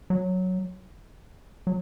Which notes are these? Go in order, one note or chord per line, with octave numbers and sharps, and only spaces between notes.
F#3
F#3